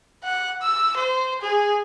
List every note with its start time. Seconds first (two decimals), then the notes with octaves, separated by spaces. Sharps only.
0.24 F#5
0.61 E6
0.97 C5
1.42 G#4